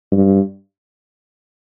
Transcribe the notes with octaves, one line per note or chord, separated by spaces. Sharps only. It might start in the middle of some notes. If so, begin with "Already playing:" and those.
G2